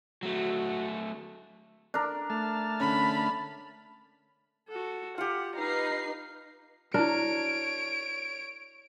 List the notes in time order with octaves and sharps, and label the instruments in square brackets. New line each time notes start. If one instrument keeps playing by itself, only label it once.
[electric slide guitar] F#3 A3 [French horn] F#4
[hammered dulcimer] D4 A#4
[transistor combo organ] A3 A5 F6
[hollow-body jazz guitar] D3 C#4 [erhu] B5
[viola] F#4 A4
[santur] F4 G4 [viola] F#5
[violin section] D#4 B4 C7 [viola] F5 A#5
[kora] D4 A#4 [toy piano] E4 F#4 [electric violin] C#5 D7